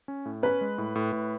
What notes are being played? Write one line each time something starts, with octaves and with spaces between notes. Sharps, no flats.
C#4
A2
C#4 B4
G#3
A2
A2
A2